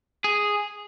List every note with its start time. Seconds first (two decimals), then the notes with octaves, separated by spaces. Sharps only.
0.24 G#4